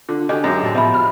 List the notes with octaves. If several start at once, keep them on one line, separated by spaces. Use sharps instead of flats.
D3 F4
D3 C#4 F#4 G4 D#5 G#5
F#2 G#3 G4
A2 A#3 C4 D4 F#4 A5
B2 F3 D#5 E5 B5
B5 F6